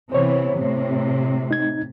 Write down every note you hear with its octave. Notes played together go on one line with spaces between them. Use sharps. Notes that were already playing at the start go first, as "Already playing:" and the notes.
C3 E3 B3 C5 C#5
A2 C3
D#4 G#6